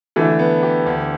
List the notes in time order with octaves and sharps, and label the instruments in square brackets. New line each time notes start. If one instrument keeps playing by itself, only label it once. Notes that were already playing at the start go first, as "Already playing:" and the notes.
[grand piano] D3 [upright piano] E3 A3
[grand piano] B3
G4
D2